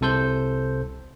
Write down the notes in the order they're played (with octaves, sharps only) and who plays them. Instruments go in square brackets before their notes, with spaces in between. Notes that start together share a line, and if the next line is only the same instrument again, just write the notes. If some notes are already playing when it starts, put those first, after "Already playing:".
[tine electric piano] C2 C3 A4 C5 G6